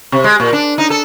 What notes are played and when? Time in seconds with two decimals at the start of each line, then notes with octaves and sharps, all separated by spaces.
0.12 C3
0.24 G#3
0.40 A#2
0.53 D4
0.78 D#4
0.90 A4